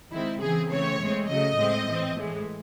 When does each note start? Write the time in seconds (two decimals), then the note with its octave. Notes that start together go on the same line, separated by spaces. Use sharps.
0.12 D#3 G#3 C4 E4
0.41 C#3 E3 C4 G#4
0.70 C#3 E3 A3 C4 C#5
1.00 A2 G#3 C4
1.28 C#3 F#3 A3 D#5
1.58 A2 G#3 C4
1.87 A2 E3 C4
2.16 A2 E3 G#3